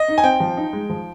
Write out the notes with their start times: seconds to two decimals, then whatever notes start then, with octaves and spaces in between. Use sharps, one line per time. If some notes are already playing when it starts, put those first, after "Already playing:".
Already playing: D#5
0.08 D#4
0.18 G#5
0.24 C4 G5
0.40 F3
0.57 D#4
0.73 G#3
0.90 F3